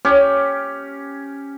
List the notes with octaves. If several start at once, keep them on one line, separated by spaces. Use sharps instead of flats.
C#4 G4